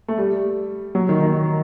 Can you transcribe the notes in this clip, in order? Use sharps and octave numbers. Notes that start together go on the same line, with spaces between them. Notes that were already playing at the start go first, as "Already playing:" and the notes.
A3
G3
F#3
D#3
D#3